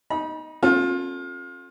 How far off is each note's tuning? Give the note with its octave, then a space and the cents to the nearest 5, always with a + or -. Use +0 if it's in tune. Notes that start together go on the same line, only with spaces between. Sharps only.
D#4 +0 B5 -35
C#4 -40 F4 +30 A4 +0